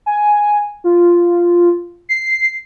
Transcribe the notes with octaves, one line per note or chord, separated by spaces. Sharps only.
G#5
F4
C7